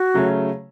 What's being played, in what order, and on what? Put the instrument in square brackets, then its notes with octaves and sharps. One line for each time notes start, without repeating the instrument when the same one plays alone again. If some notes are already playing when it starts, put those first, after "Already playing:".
Already playing: [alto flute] F#4
[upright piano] C#3 F#3 A3 C#4